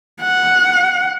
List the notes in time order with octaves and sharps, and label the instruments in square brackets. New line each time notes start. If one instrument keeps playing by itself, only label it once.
[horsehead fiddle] F#5